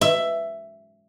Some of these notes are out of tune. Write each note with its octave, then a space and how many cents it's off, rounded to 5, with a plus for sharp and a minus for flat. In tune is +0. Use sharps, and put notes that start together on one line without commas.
E5 +10